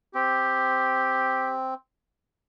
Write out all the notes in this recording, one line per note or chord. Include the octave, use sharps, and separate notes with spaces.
C4 G4